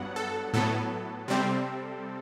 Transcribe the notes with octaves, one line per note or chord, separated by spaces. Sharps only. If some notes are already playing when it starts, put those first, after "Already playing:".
Already playing: G2 F#3 B3 F#5
A4
A2 F#3 B3 A4
C3 G3 C4